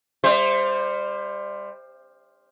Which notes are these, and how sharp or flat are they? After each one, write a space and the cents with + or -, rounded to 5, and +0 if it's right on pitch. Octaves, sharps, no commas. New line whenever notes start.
G3 +30 C5 +0 E5 +15